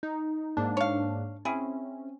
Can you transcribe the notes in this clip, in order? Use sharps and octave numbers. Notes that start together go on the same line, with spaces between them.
D#4
G#2 A#3 D4
C#5 F5
C4 C#4 E4 G#4